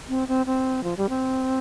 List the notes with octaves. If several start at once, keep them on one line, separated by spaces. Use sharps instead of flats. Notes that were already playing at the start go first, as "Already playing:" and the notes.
C4
C4
C4
F3
G3
C4